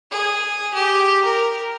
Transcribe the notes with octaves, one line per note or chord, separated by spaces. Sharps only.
G#4
G4
A#4